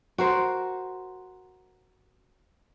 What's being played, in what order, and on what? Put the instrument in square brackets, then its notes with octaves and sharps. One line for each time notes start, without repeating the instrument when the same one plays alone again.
[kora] F#4 A#4 C5